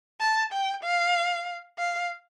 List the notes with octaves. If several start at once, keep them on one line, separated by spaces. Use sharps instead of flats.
A5
G5
F5
F5